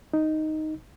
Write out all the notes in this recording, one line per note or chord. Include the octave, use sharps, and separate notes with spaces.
D#4